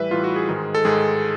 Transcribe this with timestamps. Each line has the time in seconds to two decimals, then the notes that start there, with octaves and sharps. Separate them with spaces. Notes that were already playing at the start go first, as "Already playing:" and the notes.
Already playing: A2 E3 G3 B4 E5
0.11 A2 E3 G3 F4
0.24 F#4
0.36 G#4
0.48 G#2 D#3 G#3
0.75 A4
0.85 G#2 D#3 G#3 G#4